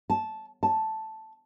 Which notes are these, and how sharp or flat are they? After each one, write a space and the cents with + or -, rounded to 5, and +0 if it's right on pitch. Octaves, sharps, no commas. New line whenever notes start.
A5 -10
A5 +0